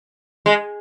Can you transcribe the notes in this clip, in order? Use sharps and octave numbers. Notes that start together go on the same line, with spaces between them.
G#3